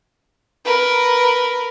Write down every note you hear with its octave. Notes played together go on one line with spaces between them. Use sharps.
A#4 B4